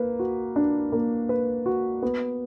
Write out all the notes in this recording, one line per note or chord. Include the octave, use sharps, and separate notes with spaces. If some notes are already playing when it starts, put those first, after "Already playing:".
Already playing: A#3 B4
F#4
D4
A#3
B4
F#4
B3